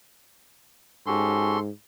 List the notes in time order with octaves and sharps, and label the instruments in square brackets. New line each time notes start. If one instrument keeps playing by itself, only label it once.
[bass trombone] G#2 [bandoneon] C#4 F#4 G4 [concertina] A4 C6